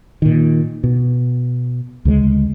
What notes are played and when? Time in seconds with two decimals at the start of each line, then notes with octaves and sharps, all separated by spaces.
0.22 A#2 D#3
0.84 B2
2.05 D2 C#3 F3 G#3